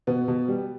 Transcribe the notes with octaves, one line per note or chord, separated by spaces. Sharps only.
B2 B3
B2
G3